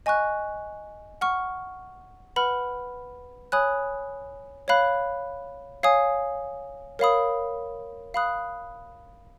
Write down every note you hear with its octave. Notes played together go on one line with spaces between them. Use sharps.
D#5 G#5 C#6 F#6
F#5 C#6 F6
B4 F#5 B5 F6
C#5 G#5 B5 D#6 F#6
C#5 F5 B5 F#6
C#5 F5 G#5 D#6
A#4 C#5 F5 B5 D#6
F5 B5 D#6 F#6